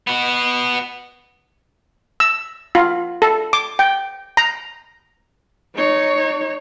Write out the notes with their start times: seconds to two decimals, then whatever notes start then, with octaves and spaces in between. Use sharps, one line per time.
0.07 B3 F#4
2.20 E6
2.75 F4
3.22 A4
3.53 D6
3.79 G5
4.37 A#5
5.76 D#4 C#5